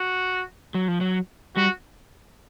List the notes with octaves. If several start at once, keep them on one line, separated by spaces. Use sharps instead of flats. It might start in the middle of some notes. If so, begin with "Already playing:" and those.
Already playing: F#4
F#3
F3
F#3
G3 F#4